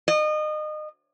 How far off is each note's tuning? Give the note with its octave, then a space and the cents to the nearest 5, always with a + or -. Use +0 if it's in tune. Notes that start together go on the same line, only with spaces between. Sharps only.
D#5 -30